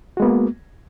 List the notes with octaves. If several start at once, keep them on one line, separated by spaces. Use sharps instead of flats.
G#3 A#3 B3 F#4